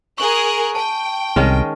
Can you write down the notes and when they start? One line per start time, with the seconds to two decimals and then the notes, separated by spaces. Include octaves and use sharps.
0.18 G#4 A#4 C#6 F#6
0.75 G5 A5
1.36 C2 D#3 G#3 C#4